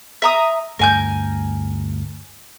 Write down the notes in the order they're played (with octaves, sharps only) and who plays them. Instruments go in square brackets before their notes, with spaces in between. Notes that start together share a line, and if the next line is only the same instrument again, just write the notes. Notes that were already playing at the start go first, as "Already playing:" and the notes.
[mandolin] E5 A#5 D#6
[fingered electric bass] D2 G2 A3 [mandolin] A#4 G#5 G6